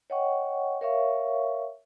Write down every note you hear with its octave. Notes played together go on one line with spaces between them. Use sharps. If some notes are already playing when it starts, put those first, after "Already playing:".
C#5 D#5 F#5 G5 C#6
A#4 C#5 E5 F5 C#6